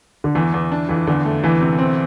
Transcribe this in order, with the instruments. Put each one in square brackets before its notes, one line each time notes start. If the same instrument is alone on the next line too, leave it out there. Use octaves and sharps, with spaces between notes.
[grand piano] D3
[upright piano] E2 [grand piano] E3
[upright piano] E2
D4
[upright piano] F2 [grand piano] E3
[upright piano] E2 [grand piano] D3
[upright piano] A3
[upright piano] E2 [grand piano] E3
[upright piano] C3
C4